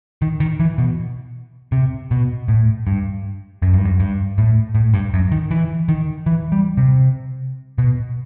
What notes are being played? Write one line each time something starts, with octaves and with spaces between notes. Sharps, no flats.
D#3
D#3
E3
B2
C3
B2
A2
G2
F#2
G2
F#2
G2
A2
A2
G2
F#2
D#3
E3
D#3
E3
G3
C3
B2